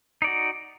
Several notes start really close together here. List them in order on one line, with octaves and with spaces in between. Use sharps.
D#4 D5 F#4